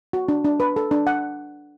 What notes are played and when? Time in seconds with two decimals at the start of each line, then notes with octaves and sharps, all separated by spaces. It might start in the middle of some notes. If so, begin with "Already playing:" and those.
0.13 F#4
0.29 D4
0.45 D4
0.60 B4
0.76 A4
0.91 D4
1.07 F#5